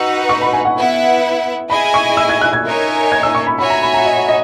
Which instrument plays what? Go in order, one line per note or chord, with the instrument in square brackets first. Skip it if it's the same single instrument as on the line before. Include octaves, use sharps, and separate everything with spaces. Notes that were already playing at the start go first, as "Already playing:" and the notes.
Already playing: [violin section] D#4 F#4 B4 F#5 [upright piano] E6
[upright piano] C#6
B5
G#5
F#5
[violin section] B3 E4 B4 F#5
[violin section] E4 G#4 D#5 G#5 [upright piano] B5
[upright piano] C#6
E6
G#6
F#6
G#6
[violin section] D#4 A#4 C#5 E5 G#5
[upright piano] G#6
E6
C#6
B5
[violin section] F#4 C#5 E5 G#5 [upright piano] B5
[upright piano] A#5
B5
A#5
D#5
D#5